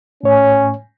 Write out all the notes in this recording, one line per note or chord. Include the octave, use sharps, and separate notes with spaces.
A2 C#4 C#5